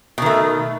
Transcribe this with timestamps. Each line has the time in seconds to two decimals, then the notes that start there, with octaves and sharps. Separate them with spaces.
0.18 B2
0.22 D#3
0.26 A3